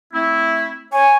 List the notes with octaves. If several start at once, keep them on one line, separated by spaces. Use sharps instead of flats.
A3 C4 E4
C#5 G#5